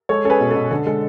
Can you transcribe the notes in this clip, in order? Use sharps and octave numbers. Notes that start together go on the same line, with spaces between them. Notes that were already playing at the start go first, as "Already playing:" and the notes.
G#3 A4 C#5
C#4 A4
G#4 B4
B2
A4
B2
D3 A4
G#3 A4